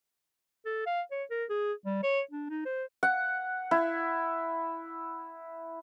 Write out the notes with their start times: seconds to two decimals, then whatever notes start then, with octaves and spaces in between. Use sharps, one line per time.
0.66 A4
0.87 F5
1.12 C#5
1.31 A#4
1.50 G#4
1.86 G3
2.03 C#5
2.31 D4
2.50 D#4
2.66 C5
3.03 F#5
3.71 E4